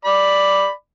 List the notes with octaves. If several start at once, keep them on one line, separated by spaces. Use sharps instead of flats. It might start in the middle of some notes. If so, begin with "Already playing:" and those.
D5 B5